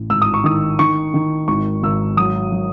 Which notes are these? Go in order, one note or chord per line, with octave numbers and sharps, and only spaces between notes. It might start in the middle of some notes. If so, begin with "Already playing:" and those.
Already playing: A1
G#1 E6
D#6
C#6
D#3 D#6
D#3 C#6
D#3
G#1 C#6
G#1 E6
F#3 D#6
F#3